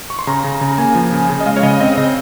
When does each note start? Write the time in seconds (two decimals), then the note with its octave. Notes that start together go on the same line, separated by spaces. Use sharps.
0.10 C#6
0.19 C6
0.27 C#3 A#5
0.44 C#3
0.61 C#3
0.78 A#3 G#5
0.95 F3
1.12 C#3
1.30 C#3
1.40 D#5
1.46 G#3 F5
1.57 C#5
1.63 C#3 D#5
1.80 C4 D#5
1.97 C#3 D#5